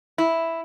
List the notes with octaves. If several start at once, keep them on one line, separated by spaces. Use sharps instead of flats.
E4